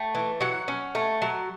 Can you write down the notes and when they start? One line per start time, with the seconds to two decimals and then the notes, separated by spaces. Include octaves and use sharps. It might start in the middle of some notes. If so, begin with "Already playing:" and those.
Already playing: A3 G5
0.15 E3
0.41 F#3 F#5
0.68 C#4
0.95 A3
1.22 F#3